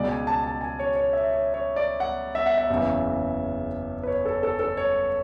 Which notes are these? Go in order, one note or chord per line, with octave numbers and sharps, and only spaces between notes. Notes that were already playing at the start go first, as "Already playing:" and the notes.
Already playing: C#2 B2 G#3 D5
G#5
A5
A5
G#5
C#5
C#5
E5
C#5
C#5
D5
F#5
E5
F#5
E5
F#1 E2 C#3 E3
B4
C#5
A4
A4
A4
C#5